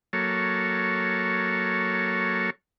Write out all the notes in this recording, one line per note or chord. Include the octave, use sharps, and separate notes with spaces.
F#3 A#3 A4 C#5